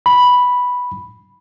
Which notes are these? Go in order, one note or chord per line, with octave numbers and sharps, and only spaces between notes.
B5